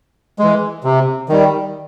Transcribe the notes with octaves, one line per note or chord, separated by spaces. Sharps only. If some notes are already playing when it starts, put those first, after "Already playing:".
E3 G#3
C3
D#3 G3